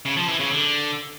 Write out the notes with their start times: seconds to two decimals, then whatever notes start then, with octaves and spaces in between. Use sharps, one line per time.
0.05 C#3
0.17 F3
0.28 E3
0.40 C#3
0.51 D3